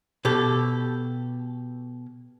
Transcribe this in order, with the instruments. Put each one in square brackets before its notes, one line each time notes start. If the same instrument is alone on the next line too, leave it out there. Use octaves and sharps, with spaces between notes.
[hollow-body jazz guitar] B2 G4 A4